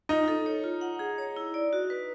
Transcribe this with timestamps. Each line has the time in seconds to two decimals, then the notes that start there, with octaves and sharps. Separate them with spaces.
0.09 D#4 F4
0.28 A4
0.46 C#5
0.64 F4
0.81 F#5
0.99 G#4
1.18 C#5
1.36 E4
1.54 D5
1.73 F#4
1.90 B4